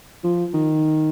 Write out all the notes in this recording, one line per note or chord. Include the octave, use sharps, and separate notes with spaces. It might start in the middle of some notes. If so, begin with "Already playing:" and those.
F3
D#3